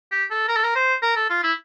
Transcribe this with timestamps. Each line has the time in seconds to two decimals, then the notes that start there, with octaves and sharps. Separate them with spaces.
0.12 G4
0.31 A4
0.48 A#4
0.56 A4
0.64 A#4
0.76 C5
1.03 A#4
1.16 A4
1.30 F4
1.43 E4